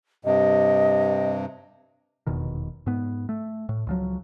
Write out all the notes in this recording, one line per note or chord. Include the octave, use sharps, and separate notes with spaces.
G2 C3 D#5
F1 E2 B2 D#3
G#2 B3
A3
A2
C#2 F3 F#3